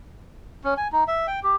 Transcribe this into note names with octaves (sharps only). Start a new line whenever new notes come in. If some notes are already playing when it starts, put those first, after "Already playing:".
C#4
G#5
D#4
E5
G5
G4